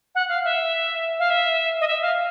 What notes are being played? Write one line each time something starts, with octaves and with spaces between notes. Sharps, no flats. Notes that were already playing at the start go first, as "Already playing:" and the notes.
F#5
F5
E5
F5
E5
D#5
E5
F5